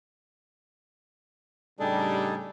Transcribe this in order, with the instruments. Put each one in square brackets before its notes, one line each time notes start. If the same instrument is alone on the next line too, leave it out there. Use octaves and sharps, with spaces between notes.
[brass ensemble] A2 C#3 G3 [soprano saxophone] D4 [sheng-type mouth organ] D#4 G#4 A4